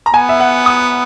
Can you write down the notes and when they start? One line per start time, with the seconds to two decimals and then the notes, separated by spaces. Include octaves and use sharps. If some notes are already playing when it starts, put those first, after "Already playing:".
0.06 A#5
0.13 B3 G#5
0.29 E5
0.40 F#5
0.66 D#6